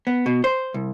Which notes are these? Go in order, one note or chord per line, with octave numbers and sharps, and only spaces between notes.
B3
B2
C5
C2